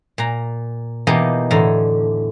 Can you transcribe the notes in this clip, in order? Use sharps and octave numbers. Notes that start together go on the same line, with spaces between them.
A#2 A#5
B2 E3 A#3 D#4 G4
E2 A2 D3 A4 A#5